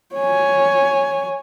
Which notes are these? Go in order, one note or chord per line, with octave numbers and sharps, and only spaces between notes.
C#5 G#5